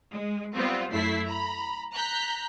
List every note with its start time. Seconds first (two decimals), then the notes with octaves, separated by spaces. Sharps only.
0.13 G#3
0.56 G3 B3 C4 F4
0.92 F#2 A3 E4 B6 C7
1.27 A#5 B5
1.94 A#5 F#6 G6 B6